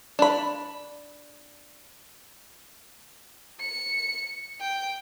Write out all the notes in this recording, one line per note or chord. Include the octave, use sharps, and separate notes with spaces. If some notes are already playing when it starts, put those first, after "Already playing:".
D4 B5
C#7
G5